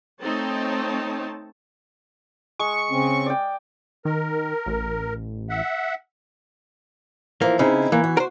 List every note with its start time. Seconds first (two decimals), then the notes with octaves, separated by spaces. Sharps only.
0.21 A3 C4 D#4 C#5 A5
2.59 G#3 C#6
2.90 C#3 C4 C#4
3.26 D5 G5
4.05 D#3 A#4
4.66 A1
5.50 E5 F#5
7.41 E3 F3 A#3
7.59 C#3 C4 D#4 E4
7.92 E3 A#3
8.04 F#4
8.17 A#4 C5